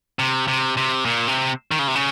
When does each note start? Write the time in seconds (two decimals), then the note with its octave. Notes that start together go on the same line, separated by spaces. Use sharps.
0.19 C3
0.48 C3
0.77 C3
1.05 A#2
1.28 C3
1.71 D#3
1.79 C#3
1.88 C3
1.95 C#3